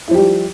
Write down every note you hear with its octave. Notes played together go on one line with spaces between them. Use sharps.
F3 G3 E4 G4